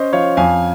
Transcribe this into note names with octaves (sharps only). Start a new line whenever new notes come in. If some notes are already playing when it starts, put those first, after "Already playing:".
Already playing: C#4 C5 D#5
F3 C#5 F5
F2 F5 G#5